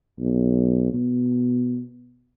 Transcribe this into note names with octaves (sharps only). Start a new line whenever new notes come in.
B1
B2